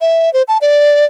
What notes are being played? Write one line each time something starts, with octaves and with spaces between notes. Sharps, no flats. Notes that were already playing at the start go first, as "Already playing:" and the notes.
E5
C5
A5
D5